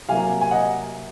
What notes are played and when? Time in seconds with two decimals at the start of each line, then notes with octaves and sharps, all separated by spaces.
0.09 C3 F#3 A#3 F5 G#5
0.41 G#5
0.51 D#5 F#5